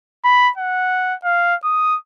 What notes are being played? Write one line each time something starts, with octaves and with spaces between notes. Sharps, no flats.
B5
F#5
F5
D#6